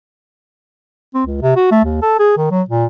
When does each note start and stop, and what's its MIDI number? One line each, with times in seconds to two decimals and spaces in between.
1.14 1.23 60
1.26 1.41 37
1.42 1.52 48
1.56 1.71 66
1.71 1.83 57
1.85 1.99 39
2.02 2.17 69
2.20 2.33 68
2.37 2.47 51
2.51 2.62 54
2.69 2.86 46